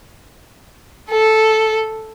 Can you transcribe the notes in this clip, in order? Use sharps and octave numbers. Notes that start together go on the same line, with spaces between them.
A4